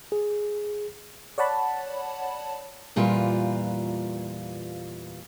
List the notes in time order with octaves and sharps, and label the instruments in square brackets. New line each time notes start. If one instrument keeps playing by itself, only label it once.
[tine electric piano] G#4
[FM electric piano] C#5 D5 F#5 A5 B5
[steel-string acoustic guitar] E2 A#2 G3 F4 B4